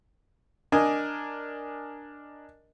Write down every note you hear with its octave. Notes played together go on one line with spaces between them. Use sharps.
D4 A#4 D#5 G#5